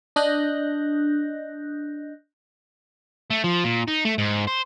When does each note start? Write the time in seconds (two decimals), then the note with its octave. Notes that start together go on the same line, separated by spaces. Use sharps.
0.16 D4 D#5 F#6 G6 A#6
3.30 A3
3.44 F3
3.64 A#2
3.88 D#4
4.05 A3
4.18 G#2
4.47 C5